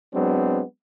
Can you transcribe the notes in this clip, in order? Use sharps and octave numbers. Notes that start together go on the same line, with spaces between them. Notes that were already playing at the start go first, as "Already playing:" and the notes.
F#3 G#3 B3 C4 D4